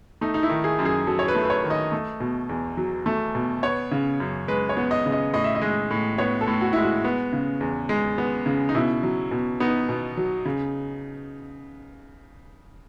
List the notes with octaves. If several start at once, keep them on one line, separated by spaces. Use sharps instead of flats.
A3 D#4
D#4
E4
D#3
G#4
F#2
G#4
F#3 A4
C#5
B4
A3
B4
C#5
D#3
D#5
A3
B2
E2
F#3
A3
B2
B3 C#5
C#3
F#2
G#3 B4
C#5
B3
D#5
C#3
D#5
A2 D#5
E5
D#5
G#3
A2
B3 C#5
A4
A2
F#4
G#3 E4
F#4
B3
C#3
E2
G#3
B3
C#3
D#4
B2 E4
F#3
B2
B3 D#4
B2
F#3
C#3